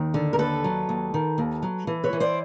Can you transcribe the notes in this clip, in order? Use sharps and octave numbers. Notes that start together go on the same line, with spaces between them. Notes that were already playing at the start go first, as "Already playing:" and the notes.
Already playing: D#2 D#3
D3
A#4
D#2 A4 B4
F#3
D#2
D#3
D#2
F#3
E3
B4 C#5
E3
C5 D5